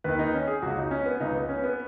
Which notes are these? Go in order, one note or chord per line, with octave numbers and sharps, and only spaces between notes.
D#2 D#3 B4
D#4
C#4
G#4
C#2 C#3 F#4
D#4
C#4
B3
C#2 C#3 D#4
B3
C#4
B3